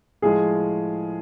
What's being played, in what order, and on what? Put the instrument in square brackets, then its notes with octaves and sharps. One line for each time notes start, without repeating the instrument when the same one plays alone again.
[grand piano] A2 F3 G#3 G#4